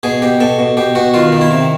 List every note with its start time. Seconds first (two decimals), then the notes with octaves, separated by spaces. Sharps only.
0.03 B2 G#4
0.22 B2 G4
0.40 B2 A4
0.59 B2
0.77 B2 G4
0.95 B2 F#4
1.14 D#3 F4
1.32 D#3
1.41 E4
1.51 C3